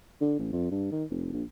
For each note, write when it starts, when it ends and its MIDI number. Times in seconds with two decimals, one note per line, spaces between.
0.21 0.34 50
0.39 0.51 33
0.52 0.68 41
0.71 0.89 43
0.92 1.04 51
1.10 1.31 29
1.33 1.43 34